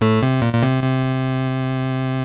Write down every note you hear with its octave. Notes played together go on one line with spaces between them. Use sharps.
A2 A3
C3
A#2
A#2
C3
C3